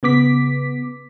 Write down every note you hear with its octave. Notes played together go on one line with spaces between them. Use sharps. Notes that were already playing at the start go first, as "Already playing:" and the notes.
C#3 B3 D6 B6